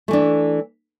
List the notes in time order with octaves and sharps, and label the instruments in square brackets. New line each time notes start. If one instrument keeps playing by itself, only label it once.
[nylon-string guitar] A3
E3
D4